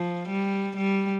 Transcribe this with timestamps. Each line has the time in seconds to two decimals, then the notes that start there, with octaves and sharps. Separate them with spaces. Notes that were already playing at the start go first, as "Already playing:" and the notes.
Already playing: F3
0.29 G3
0.77 G3